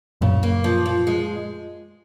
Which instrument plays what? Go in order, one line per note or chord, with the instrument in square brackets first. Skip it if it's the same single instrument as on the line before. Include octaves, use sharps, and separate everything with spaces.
[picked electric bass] F#2 A#2 [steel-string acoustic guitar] C#3
[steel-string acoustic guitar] A#3
F3
F3
G#3